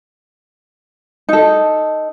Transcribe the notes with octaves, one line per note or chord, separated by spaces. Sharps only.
D#4 A4